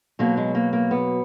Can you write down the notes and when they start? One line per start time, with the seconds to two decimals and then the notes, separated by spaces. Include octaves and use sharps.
0.19 B2 F#3 A#3
0.37 G#3
0.55 A#3
0.73 A#3
0.91 B3